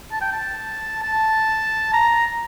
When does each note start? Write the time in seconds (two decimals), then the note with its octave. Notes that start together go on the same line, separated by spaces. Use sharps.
0.12 A5
0.21 G5
0.32 A5
1.03 A5
1.93 A#5